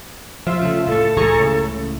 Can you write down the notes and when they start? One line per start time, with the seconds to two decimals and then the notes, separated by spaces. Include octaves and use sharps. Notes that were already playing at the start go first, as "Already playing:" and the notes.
0.47 F3 F4 E5
0.62 C#3 A3
0.87 A2 A3 A4
1.17 C#2 A2 E3 G#4 A#5 C#6
1.39 C#3